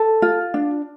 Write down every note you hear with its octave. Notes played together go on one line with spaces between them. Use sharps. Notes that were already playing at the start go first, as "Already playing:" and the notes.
Already playing: A4
F4
D4